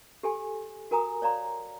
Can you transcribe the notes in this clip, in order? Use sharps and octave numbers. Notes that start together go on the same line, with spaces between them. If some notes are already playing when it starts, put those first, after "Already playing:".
G4 A4 G#5 C6
F#4 A#4 G#5 A#5 D#6
C#5 D5 F5 A#5 C6